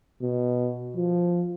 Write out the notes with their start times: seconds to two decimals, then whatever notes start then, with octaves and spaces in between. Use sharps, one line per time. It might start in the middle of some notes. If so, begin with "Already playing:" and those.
0.21 B2
0.96 F3